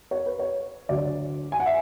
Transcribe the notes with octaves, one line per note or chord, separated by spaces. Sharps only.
C#5
B4
C#5
D2 D3 F#3 D5
G#5
F#5
E5